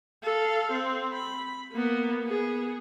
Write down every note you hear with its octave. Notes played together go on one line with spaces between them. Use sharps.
A4 F5
C4
B5
A#3 B3
B3 G#4